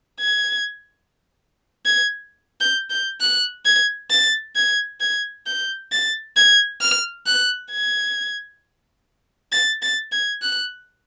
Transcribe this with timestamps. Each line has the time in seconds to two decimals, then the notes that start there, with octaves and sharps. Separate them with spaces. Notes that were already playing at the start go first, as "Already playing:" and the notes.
0.20 G#6
1.86 G#6
2.60 G6
2.90 G6
3.21 F#6
3.65 G#6
4.11 A6
4.56 G#6
5.00 G#6
5.46 G6
5.91 A6
6.36 G#6
6.81 F6
7.26 F#6
7.72 G#6
9.52 A6
9.82 A6
10.12 G#6
10.42 F#6